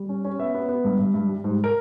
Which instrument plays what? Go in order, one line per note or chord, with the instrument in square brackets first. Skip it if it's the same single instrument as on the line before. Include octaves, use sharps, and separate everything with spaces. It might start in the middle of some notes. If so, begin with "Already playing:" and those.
Already playing: [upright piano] G3
C#4
C#4
B3 E5
B3
B3
G2
G2
G2
G3
G#2
A#4